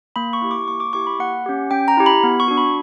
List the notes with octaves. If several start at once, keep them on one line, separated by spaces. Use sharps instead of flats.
A#3 B5
C#6
E4 G4
D6
A#3 C#6
D6
E4 G4 C#6
B5
A#3 F#5
C#4 G4
C#4 G5
A#5
E4 G4
B5
B3
C#6
D4 F#4
B5